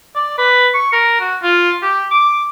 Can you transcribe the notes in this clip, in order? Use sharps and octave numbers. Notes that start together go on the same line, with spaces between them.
D5
B4
C#6
A#4
F#4
F4
G4
D6